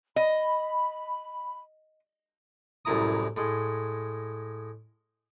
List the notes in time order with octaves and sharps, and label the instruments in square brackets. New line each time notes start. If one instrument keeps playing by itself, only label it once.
[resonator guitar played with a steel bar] D#5 [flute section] B5
[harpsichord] C2 F#2 A2 E4 A#5 D#6
A2 G#3